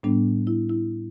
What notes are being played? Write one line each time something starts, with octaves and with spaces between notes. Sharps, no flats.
A2 G3 B3 D4
E4
E4